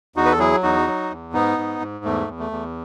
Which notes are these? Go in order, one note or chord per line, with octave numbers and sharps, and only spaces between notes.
E2 D#4 F#4
B4
A4
F#3 E4 G#4
E2 D#4 F#4
F#3
E2
G#2 B3 D#4
G#2
G#2
E2 A3
E2
A3
E2